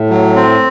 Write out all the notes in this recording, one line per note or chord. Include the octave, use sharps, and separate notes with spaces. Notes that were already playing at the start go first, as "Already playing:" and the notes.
Already playing: A2
F#3
C4